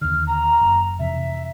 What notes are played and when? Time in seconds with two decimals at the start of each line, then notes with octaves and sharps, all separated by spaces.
0.01 D#2 D3 F6
0.27 A#5
0.61 F#1
0.99 F2 C3 E3 E5